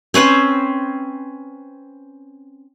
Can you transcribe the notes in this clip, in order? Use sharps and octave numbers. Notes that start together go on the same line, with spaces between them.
C4 C#4 B4 C5